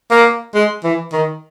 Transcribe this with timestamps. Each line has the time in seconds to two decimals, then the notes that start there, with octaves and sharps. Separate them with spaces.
0.11 A#3
0.55 G#3
0.84 E3
1.13 D#3